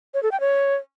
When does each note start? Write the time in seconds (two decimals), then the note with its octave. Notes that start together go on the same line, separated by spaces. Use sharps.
0.14 C#5
0.23 A4
0.32 G5
0.40 C#5